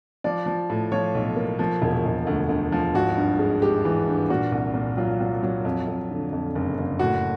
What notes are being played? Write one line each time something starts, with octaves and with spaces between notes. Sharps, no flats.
F3 D5
F3
A2
F3 C#5
B1
A#3
F3
E1
E1
D2
D2
F3
G#1 F#4
G2
G#3
G#3 G4
E3
G2
A#2 F#4
C2
A#2
F#3 F4
F#3
F#3
F2
F2
D3
F2
F#1
F#1
A2 F#4